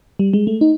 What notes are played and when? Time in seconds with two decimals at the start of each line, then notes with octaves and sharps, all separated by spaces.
0.19 G3
0.33 G#3
0.47 A3
0.61 D#4